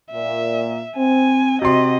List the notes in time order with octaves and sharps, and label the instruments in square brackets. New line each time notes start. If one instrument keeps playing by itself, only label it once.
[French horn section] A#2 [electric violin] E5
[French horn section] C4 [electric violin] G#5
[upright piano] C3 C6 [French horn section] F#4 [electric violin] D#5